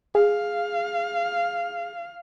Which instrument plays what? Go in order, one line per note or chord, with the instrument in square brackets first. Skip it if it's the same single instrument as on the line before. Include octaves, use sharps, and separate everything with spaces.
[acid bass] G#4 [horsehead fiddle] F5